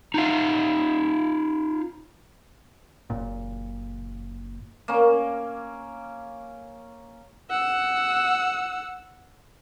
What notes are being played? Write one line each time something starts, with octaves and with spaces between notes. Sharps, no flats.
D#4 F4 F5
F#1 A#2
A#3 C#4
F#5 E6